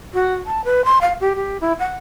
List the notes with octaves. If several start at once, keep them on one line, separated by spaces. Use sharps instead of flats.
F#4
A5
B4
C6
F5
G4
G4
E4
F#5